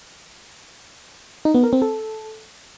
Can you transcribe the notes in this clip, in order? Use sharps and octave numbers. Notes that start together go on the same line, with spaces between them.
D#4
B3
A#4
C4
A4